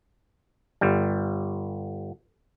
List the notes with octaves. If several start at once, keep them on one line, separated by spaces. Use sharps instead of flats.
G1 G3